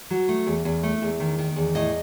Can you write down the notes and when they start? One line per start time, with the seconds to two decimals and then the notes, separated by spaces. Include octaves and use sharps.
0.10 F#3
0.29 A3
0.47 E2
0.65 E2
0.83 A3
1.02 E2
1.20 D#3
1.39 D#3
1.56 E2
1.75 A2 D#5